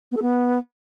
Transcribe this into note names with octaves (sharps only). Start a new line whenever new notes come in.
B3
A4
B3